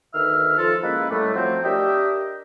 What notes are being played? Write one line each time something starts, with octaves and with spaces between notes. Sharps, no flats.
D2 D#3 B4 E5 F6
F3 F4 A4
G#3 A#3 C#4 E4 B4
A2 G3 A3
F3 F#3 A3 C4
D4 G4 A#4 D#5 E5 G5